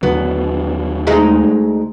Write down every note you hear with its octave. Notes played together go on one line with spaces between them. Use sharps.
D#2 D3 F#3 B3
D2 G#3 D#4